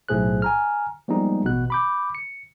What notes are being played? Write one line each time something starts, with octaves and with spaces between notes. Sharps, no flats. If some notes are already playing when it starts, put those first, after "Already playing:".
B1 A2 A3 G#4 C5 F#6
G#5 A#5 F6
F3 G3 G#3 A#3 B3 D#4
A1 B2 F#6
B5 D6 G6
C#7